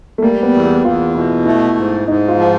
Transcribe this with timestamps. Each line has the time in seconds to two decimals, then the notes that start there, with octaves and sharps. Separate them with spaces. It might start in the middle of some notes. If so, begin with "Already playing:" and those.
0.18 A3
0.22 G3 A#3
0.43 B3
0.53 E2
0.84 E2 F4
1.15 B2 E4
1.46 A3 E4
1.77 G#2
2.08 G#2 D#4
2.28 F4
2.39 F3